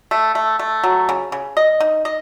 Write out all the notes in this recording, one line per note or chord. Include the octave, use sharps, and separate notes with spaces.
A3
A3
A3
F#3
C#3
C#3
D#5
D#4
D#5